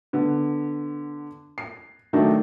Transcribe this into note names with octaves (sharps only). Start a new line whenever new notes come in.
D3 B3
C7
D#3 F#3 A3 D4 D#4